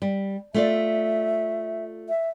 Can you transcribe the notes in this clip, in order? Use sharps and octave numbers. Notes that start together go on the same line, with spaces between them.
G3
A3 F4 D5 E5
E5